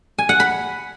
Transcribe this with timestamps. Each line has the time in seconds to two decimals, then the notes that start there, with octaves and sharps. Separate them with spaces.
0.18 G#5
0.29 F#5
0.40 B5